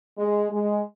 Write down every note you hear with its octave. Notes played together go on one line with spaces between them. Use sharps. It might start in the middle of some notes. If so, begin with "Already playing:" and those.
G#3
G#3